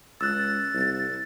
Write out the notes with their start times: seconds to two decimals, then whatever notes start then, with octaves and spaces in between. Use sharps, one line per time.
0.21 C#2 E6 F#6 A6
0.74 C2